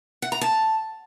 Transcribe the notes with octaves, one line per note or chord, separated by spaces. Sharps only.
F#5
A#5
A5